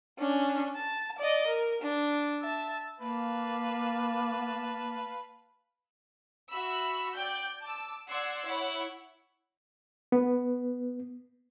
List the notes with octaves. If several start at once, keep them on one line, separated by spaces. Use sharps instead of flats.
C#4 D4
A5
D5 D#5
A#4
D4
E5 A5
A#3 B4 F5 A5
F#4 E5 B5 E6
D5 G5 G6
A5 D6 E6
D5 F#5 C6 E6 G#6 C7
E4 C#5 F#5
B3